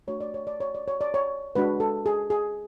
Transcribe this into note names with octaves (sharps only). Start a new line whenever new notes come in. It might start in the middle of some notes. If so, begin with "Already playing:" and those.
A3 D4 F#4 C#5
D5
C#5
D5
C#5
D5
C#5
D5
C#5
G#3 D4 F#4 B4
A4
G#4
G#4